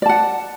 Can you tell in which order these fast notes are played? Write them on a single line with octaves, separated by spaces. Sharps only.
D5 A5 F#5